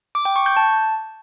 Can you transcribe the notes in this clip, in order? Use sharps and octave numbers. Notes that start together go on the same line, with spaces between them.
D6
G5
C#6
G6
A5